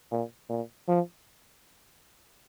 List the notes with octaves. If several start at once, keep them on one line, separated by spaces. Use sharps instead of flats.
A#2
A#2
F3